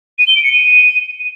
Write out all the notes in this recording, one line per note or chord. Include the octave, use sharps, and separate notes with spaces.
D#7
G7
D7
C#7
D#7